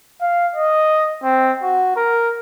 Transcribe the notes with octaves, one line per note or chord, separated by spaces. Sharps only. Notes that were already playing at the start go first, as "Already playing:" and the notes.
F5
D#5
C4
F#4
A#4